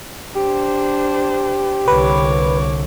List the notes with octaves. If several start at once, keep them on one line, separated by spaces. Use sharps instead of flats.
D4 G4 C5
C2 D3 B4 C#5 D6